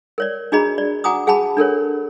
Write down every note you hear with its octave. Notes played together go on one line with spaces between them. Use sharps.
A#4 C#5 D5
D4 F#4 G#4 D#5 A#5 B5
D5
F#4 F#5 G#5 A#5 D6 D#6
G#4 F#5 G#5 A5 B5
D4 A4 A#4 C#5